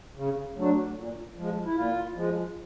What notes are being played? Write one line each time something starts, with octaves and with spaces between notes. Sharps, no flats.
C#3
F#3 A3 D4
A#2
F3 G#3
E4
A#2 F4
F3 G#3